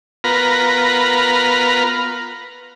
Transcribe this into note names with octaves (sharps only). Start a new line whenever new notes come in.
B3 F4 A#4 B4 A#5